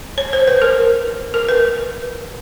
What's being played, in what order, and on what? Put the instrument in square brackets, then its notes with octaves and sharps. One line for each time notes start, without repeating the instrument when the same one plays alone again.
[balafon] C#5
C5
B4
A#4
A#4
B4